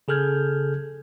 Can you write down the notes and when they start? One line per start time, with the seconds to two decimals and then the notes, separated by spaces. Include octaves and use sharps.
0.08 C#3 G#4 A4 F6 G6 G#6